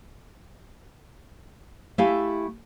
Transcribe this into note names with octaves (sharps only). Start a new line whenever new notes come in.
A3 E4 G4 E5 F5 G#5